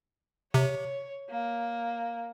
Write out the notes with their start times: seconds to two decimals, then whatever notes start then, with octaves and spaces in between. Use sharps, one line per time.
0.54 C3 C#5
1.30 A#3